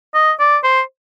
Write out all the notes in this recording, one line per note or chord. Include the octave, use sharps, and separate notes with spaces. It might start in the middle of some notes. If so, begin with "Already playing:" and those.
D#5
D5
C5